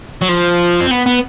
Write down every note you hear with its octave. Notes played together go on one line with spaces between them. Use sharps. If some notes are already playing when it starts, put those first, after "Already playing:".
F#3
F3
C4
B3
B3